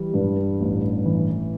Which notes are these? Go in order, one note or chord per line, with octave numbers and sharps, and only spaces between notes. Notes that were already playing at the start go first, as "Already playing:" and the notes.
Already playing: E3 G3
G2
A1
E3